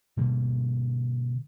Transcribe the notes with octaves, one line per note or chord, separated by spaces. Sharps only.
B2 D3 G3 A#3